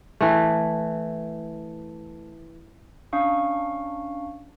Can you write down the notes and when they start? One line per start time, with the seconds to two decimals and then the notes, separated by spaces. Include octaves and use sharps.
0.21 E3 A3
3.13 C#4 D4 F5 C#6